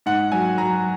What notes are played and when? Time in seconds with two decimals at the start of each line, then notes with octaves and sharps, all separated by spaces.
0.06 G#2 F#5
0.32 F#3 G#5
0.58 F#3 A#5